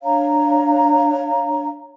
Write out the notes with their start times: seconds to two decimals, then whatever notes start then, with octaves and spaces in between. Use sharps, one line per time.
0.03 D4 C#5 F5 A#5